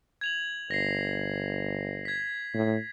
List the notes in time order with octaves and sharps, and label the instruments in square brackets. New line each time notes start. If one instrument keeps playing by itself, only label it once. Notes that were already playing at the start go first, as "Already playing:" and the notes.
[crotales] G#6 F7 F#7
[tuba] G1 [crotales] A#6 C7
[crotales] G#6 B6
[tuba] A2